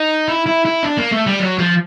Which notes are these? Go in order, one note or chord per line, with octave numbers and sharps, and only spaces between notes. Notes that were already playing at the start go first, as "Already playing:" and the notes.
Already playing: D#4
E4
E4
E4
D4
A#3
A3
G3
F#3
F3